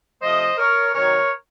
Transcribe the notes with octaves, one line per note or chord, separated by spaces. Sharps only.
C3 F3 A3 C5 D#5
A#4 C#5
C3 D#3 F#3 A#4 C#5